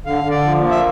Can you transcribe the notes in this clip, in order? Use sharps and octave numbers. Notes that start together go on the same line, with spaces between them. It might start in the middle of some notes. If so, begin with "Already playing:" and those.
D3 F5
D3
D5
F3
A#3
E5